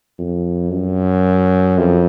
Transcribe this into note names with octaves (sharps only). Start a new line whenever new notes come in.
F2
F#2
F2